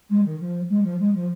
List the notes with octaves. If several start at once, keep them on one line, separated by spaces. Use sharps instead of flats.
G#3
D#3
F3
G#3
F3
G#3
F3